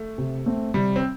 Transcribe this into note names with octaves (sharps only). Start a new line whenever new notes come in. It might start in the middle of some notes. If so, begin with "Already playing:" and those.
Already playing: A3
C3
A3 C4
C3 G3
C4